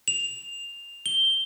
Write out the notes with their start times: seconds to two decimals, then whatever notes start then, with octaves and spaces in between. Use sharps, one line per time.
0.08 F7
1.06 G7